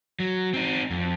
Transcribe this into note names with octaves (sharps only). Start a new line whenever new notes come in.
F#3
C4 D#4
F2